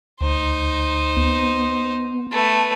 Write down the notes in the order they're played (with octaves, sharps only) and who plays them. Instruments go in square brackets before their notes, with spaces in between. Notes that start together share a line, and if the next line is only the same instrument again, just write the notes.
[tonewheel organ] D2 [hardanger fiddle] D#4 C5
[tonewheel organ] B3
[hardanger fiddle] A3 B4